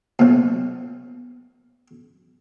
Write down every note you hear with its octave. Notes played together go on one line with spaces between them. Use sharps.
B1 A#2